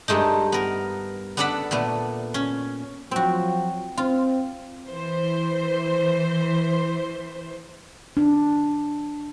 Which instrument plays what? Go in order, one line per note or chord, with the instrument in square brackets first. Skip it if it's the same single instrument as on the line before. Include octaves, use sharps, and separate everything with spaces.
[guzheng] G2 G#3 A3 D#4
B3 A#4
B3 D4 A4 D5 F#5 B5
A#2 A3 B3
C#4
[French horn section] F3 F#3 [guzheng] C4 F#4
[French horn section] C4 [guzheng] F4
[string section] E3 C5
[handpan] D4